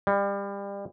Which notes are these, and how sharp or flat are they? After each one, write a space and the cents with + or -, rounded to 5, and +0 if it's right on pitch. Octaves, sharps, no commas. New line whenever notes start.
G3 +30